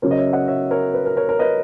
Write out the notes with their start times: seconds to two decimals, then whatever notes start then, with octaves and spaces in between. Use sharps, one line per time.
0.02 C#3 F#3 C#4 A#4 C#5
0.11 D#5
0.18 C#5 E5
0.33 D#5 F#5
0.48 C#5 E5
0.71 A#4 C#5
0.94 B4
1.06 A#4
1.17 A#4 C#5
1.29 A#4 C#5
1.39 B4 D#5